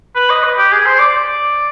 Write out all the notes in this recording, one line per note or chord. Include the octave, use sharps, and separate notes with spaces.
B4
D#5
B4
G4
G#4
C5
D5